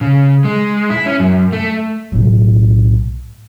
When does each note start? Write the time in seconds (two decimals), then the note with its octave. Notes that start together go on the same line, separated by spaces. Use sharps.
0.01 C#3
0.45 G#3
0.90 E4
1.06 C#4
1.20 F#2
1.53 A3
2.12 B1 A2